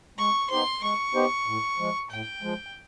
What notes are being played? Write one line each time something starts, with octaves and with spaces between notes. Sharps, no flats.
G#3 C#6
B3 D#4 G4 C5 C6
G#3 C#6
B3 D#4 G4 C5
A2
F3 G#3
A2 G5
F3 G#3